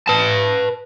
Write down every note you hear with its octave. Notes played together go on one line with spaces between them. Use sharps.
B4 A5